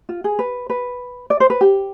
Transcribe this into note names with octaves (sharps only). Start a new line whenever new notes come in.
F4
G#4
B4
B4
D5
C5
B4
G4